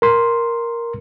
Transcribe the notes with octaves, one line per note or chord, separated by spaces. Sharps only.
A#4 C6